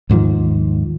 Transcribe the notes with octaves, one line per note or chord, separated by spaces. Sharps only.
D#2 G#2 D#3 F3